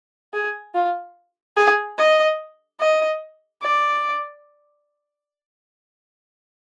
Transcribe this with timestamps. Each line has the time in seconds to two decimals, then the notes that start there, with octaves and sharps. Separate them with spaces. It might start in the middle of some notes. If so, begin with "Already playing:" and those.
0.33 G#4
0.75 F4
1.57 G#4
1.98 D#5
2.80 D#5
3.63 D5